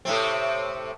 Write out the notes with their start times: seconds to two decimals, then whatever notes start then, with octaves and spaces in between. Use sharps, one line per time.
0.05 A2 C3 C4